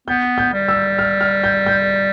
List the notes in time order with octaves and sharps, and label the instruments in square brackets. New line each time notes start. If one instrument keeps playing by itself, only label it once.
[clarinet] B3 [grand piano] G6
[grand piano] G6
[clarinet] G3
[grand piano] E6
F6
F6
G6
G6